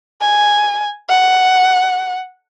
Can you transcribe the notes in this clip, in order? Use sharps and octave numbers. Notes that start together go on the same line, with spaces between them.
G#5
F#5